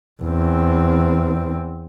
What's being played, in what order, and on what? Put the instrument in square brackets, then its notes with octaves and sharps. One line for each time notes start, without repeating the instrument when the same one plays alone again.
[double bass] E2 C4